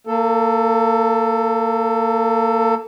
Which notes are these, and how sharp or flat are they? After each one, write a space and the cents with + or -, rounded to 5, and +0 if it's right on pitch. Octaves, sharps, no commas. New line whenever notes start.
A#3 -20 A4 +10